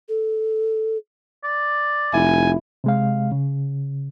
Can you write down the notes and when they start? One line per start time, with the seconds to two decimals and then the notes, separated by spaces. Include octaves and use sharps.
0.09 A4
1.44 D5
2.13 F1 E4 G#5
2.84 C3 G#3 F5
3.32 C#3